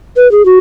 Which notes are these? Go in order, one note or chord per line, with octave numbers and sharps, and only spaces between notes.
B4
G#4
F#4